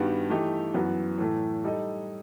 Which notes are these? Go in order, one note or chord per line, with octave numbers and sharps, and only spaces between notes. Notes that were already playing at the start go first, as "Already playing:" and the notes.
Already playing: G2 D#3 G3 B3 F#4
E3 A3 D#4 G4
F#2 E3 B3 F#4
A2 E3 A3
G3 D#4 A4 D#5